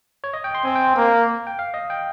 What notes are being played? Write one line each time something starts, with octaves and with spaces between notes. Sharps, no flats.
C#5
D#5
G5
C6
C4 G#5
G5
A#3
G5
F5
D#5
G5